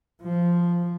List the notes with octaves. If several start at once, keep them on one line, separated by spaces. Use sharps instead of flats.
F3